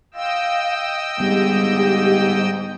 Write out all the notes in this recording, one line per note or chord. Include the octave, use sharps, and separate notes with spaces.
D#5 F5 G5 E6
G#2 G3 B3 G4